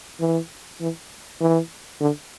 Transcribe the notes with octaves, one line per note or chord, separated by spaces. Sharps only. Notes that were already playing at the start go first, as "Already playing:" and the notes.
E3
E3
E3
D3